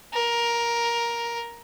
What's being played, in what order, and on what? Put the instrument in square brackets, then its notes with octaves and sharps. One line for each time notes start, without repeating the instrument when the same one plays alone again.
[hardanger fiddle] A#4